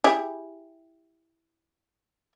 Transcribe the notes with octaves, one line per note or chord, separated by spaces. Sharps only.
E4 G4 G#4